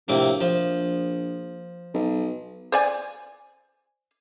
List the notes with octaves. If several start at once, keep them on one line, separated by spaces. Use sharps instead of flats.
A#1 A2 C3 A#3
F3
B1
C5 D5 G#5